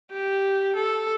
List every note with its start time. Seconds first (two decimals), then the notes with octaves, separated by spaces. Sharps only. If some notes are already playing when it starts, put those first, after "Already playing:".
0.11 G4
0.76 A4